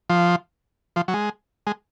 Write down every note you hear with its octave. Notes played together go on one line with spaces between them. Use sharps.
F3
F3
F#3
G#3
G#3